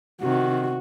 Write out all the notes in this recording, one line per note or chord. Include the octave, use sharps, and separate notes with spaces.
C3 D#3 F#4